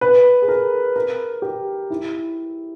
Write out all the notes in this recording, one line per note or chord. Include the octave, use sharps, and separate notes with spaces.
B4
G#4
A#4
A#4
G4
E4